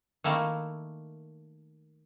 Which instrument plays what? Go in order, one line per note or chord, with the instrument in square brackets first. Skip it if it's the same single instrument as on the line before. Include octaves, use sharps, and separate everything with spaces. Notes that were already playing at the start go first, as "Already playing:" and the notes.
[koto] D#3 A3 A#3 E4